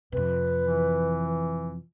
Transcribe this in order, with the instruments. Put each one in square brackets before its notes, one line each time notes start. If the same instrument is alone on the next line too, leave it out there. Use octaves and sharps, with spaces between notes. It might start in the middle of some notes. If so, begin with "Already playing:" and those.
[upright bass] F2 C3 [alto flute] B4
[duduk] E3